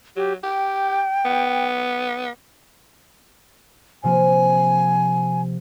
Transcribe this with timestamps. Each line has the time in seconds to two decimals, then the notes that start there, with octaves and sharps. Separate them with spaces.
0.16 F#3 G4
0.43 G4 G5
1.25 B3
4.04 C3 F3 A#3 G#5